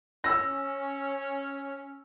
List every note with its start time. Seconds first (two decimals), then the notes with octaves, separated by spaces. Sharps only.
0.24 C#4 E6 A#6